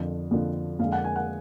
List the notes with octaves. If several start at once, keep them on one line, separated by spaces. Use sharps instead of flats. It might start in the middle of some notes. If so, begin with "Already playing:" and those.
Already playing: F2 D3 F3
F2 D3 F3
F2 D3 G#3 F5
F#5
G#5
F#5